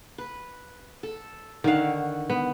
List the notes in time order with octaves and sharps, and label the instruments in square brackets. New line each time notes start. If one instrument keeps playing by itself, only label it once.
[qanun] B4
A4
[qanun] D3 C#5 F#5 [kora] D#3 F5
[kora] B3